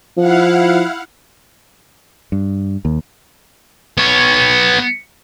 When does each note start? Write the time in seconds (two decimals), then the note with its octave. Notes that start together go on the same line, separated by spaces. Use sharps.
0.17 F3 E4 F5 F#5
2.32 G2
2.85 D#2
3.98 B3 C#5